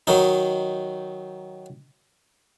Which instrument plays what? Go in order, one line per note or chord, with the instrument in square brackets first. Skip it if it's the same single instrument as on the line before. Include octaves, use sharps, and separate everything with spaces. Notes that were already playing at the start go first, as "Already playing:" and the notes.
[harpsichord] D#3 F#3 D#4